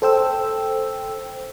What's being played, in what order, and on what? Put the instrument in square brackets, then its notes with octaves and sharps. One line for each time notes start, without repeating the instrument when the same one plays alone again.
[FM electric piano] A4 C5 G5 E6